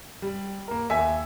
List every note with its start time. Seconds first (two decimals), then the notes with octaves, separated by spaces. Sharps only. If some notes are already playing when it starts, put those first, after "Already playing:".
0.22 G3
0.68 A#3 A#4
0.89 D#2 E5 G#5 B6